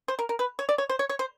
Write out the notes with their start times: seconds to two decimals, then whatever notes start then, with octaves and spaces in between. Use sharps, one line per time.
0.08 C5
0.19 A#4
0.29 A#4
0.39 B4
0.59 C#5
0.69 D5
0.78 C#5
0.89 C5
0.99 C#5
1.09 C#5
1.19 C5